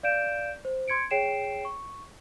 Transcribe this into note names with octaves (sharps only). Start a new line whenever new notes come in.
D5 F5 G6 D7 E7
C5
C6 G#6 C#7 D7
G#4 C#5 G5 C7 D7 E7
C#6